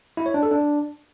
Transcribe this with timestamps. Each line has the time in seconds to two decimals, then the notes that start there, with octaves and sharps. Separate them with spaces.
0.17 E4
0.26 C#5
0.34 D4
0.43 A4
0.51 D4